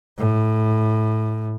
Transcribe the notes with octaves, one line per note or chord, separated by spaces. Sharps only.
A2